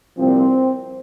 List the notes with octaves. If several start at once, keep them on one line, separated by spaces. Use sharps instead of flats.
C2 A#2 F3 C4